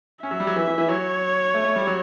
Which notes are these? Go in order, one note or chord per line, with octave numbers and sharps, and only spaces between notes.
C#4 E5
F#3
G3
F#3
E3
E3
E3
F#3 C#5
A3
A3
G3
F#3